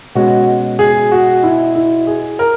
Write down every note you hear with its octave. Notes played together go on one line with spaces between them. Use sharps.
B2 G#3 C#4 F#4
G#4
F#4
E4
E4
G#4
A#4